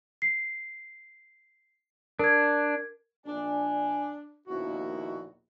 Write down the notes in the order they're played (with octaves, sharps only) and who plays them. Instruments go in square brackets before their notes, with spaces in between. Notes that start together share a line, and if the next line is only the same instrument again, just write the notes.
[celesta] C7
[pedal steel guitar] D4 [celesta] A#4 G#6
[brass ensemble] A#1 G#5 [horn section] D4
[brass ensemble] A#1 D#2 B2 [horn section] E4 F#4